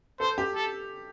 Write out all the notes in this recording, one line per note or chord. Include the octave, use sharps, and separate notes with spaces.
A4 C5
G4
A4